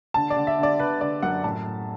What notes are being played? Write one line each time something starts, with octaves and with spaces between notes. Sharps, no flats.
D3 A5
D5
D3
E5
D3 D5
D3 B4
D3 D5
F#2 F#5
A2 A5
A2